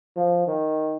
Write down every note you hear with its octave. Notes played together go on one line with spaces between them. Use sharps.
F3
D#3